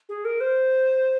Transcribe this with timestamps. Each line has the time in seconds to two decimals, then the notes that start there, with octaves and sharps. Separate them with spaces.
0.09 G#4
0.25 A#4
0.41 C5